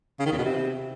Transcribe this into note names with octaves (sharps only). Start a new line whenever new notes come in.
C#3
D#3
E2
B2
C3